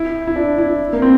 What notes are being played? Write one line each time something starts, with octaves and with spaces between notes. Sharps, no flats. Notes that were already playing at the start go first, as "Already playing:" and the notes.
Already playing: E4
E4
D4
E4
A#3
C4